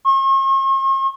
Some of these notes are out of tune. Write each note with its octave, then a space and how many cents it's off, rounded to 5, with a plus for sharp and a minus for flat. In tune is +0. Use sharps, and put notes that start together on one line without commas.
C#6 -45